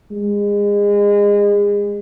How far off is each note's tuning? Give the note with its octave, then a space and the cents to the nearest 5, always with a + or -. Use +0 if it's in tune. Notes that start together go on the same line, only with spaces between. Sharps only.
G#3 -30